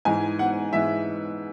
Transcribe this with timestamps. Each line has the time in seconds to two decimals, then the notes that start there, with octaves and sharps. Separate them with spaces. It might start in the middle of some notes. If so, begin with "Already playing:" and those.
0.05 G#2 E3 G#3 G#5
0.39 F#5
0.73 G#2 E3 G#3 E5